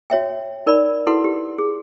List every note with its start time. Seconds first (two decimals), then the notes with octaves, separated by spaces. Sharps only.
0.10 F#4 C#5 E5 G5
0.66 D#4 A#4 D5 D#5 B5
1.07 E4 F#4 A4 B4 F#5 C6
1.24 G4
1.58 G#4